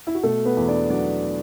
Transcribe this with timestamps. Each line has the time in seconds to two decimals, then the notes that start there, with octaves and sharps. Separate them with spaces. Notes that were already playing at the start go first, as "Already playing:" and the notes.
0.07 E4
0.15 F#4
0.23 B2 A3 A4
0.45 B3 B4
0.57 E2
0.68 D4 D5
0.90 F#3 D4 D5